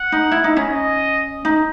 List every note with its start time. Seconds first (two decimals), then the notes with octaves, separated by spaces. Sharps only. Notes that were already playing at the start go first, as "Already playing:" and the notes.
Already playing: F#5
0.12 D#4
0.32 E4
0.44 D#4
0.57 C#4
0.70 D#5
1.45 D#4